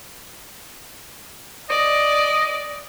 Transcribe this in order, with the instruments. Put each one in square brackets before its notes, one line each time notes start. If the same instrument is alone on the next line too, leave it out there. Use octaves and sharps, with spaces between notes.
[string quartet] D5 [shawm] D#5